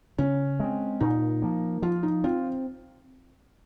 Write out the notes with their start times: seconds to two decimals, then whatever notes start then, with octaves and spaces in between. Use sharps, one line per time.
0.18 C#3 C#4
0.60 G#3 C4
1.00 A#2 D#4
1.42 F3 A#3
1.82 F3 F4
2.03 D#4
2.24 C4 F4